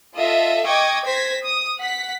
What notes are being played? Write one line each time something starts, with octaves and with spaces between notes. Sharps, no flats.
F4 A4 D#5 E5
D#5 G5 C#6 D6 G#6
C5 G#6 A#6 B6
D#6
F#5 B6